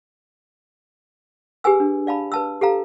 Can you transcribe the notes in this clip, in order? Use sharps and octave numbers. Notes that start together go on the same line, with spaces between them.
G4 G#4 B4 G#5 E6
D4
D5 F5 A5 B5
B4 A5 E6
G4 A4 F5 A#5